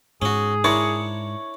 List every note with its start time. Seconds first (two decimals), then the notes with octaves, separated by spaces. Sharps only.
0.22 G#2 C#4 F#4 G#4
0.64 D4 E4 A#4 C#5